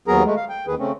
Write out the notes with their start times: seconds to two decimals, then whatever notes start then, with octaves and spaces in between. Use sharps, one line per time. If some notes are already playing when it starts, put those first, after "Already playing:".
0.08 D#2 F#3 B3 G#4 A#4 A#5
0.25 G#3 A3
0.36 F5
0.49 G5
0.67 D#2 D#3 G#4 B4
0.79 C#3 A3 C4 C#4